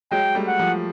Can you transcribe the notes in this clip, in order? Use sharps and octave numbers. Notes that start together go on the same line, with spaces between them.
F#3 G#3 G5
G3 A3
F#5
F3 G3